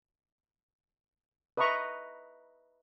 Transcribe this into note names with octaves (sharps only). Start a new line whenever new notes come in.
B4 D#5 E5 A#5 C#6